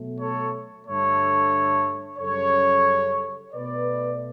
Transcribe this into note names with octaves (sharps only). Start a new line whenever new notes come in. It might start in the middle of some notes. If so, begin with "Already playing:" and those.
Already playing: B2 F#3 A3
A4 C#5
G2 D3 A3 A4 C#5
F#2 C#3 G3 A4 C#5
B2 A3 B4 D5